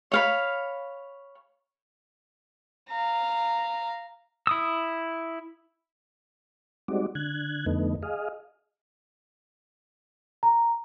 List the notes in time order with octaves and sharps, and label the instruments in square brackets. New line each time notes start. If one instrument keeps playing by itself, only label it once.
[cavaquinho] C#5 F5 B5
[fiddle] F5 A#5
[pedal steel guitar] E4 D#6 E6
[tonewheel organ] G3 G#3 C4 D#4 F#4 D5
D3 F#6 G#6
F2 D3 A3 B3 D#4
G#4 D#5 F5
[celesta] A#5